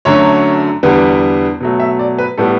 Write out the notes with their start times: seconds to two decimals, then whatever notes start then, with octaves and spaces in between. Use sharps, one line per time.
0.05 F#2 D3 F#3 A3 C#5
0.83 E2 D3 G3 B3
1.60 B2 F#3 A3
1.80 E5
1.99 D5
2.19 B4
2.38 A2 G3 B3 A4